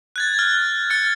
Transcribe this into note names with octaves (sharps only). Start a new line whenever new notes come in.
F#6 G#6 A6
F6
F6 A6 C#7